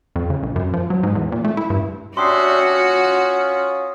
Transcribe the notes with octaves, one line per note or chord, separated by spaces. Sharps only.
F2
C#3
A#1
F#2
F3
F#3
G#2
E2
A#2
A3
E4
G2
C#4 D4 F#4 G4 E5 C6 D#6 C7
F4